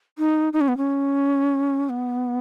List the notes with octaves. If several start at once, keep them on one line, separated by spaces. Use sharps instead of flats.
D#4
D#4
C#4
B3
C#4
B3